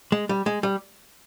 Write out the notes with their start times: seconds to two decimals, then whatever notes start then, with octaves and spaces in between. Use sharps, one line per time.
0.12 G#3
0.29 G3
0.46 G#3
0.63 G3